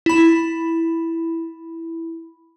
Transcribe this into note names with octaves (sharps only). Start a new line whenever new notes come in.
E4 B5